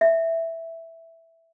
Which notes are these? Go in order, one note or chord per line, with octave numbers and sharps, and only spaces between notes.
E5